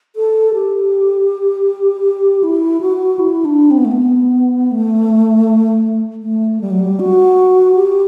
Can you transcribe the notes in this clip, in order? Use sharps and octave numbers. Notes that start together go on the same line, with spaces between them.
A4
G4
E4
F#4
E4
D4
C4
B3
A3
B3
A3
A3
G3
F#3
G3
F#4
G4